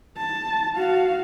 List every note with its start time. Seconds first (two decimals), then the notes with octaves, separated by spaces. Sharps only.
0.17 A5
0.77 F#4 F5